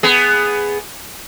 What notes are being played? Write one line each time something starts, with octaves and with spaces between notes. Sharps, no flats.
B3 G#4